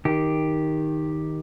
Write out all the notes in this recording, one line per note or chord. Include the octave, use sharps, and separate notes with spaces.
D#3 G4